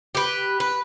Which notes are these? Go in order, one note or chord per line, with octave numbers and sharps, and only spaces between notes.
G4 B4
B4